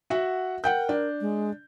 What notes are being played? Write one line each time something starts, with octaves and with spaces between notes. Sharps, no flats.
F#4 E5 F#5
A#4 F#5 G5 G6
D4
G#3